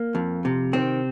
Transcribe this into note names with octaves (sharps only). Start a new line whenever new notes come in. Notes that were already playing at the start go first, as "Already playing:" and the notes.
Already playing: A#3
F2
C3
D#3 C4